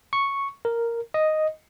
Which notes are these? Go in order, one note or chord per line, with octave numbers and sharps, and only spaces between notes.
C#6
A#4
D#5